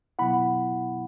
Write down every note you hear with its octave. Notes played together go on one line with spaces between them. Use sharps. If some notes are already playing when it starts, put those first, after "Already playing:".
B2 F#3 B3 E4 F#5 B5